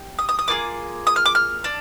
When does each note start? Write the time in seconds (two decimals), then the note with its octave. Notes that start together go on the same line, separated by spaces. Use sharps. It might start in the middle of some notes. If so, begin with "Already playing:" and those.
Already playing: G4
0.19 D#6
0.29 D#6
0.39 D#6
0.48 A#3 F4 G#4 D6
1.07 D#6
1.16 F6
1.26 D6
1.35 F6
1.64 D4